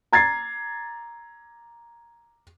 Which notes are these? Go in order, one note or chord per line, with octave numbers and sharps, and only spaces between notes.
A#5 G#6 A6 C7